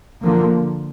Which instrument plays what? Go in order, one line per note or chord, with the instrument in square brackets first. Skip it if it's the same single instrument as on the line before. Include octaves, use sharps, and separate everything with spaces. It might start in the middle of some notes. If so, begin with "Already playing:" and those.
[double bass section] D3 F3 A#3